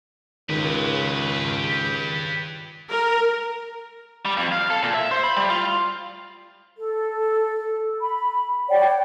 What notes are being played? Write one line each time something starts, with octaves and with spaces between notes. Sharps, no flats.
C#2 D#3 G4 B4
A#4
G3
F2
F5
A4
A#2
E5
C5
B5
G3
F4
A4
B5
C#5 D5 F#5 G5